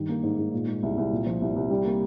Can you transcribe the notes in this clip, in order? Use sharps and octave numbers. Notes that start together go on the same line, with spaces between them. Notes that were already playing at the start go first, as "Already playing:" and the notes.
Already playing: G2 D#3
A#3
G#2
G#2
A#2
G#3
C2
C2
A#2
F3
C2
C2
G3
A#3